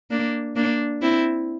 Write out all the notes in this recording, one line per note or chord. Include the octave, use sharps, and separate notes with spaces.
A#3 D4
A#3 D4
C4 E4